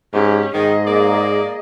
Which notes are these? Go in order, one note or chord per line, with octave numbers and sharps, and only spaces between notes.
G#2 C#4 G4
G#2 D#3 G#4 D#5
A#3 D5